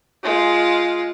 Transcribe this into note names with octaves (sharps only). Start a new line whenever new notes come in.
G#3 F4